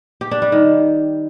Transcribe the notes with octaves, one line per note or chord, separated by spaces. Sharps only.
G4
D4
G3
D#3